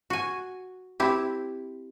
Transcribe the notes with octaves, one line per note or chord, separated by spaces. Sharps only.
F#4 G#5
C4 E4 G4